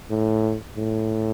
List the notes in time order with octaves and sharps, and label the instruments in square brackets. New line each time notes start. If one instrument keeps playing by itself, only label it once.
[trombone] A2
A2